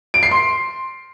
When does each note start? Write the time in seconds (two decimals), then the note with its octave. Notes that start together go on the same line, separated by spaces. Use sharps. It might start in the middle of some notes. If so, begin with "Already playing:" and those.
0.14 D7
0.23 C7
0.31 C6